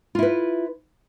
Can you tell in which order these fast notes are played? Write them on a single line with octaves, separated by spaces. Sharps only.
F4 E4 B4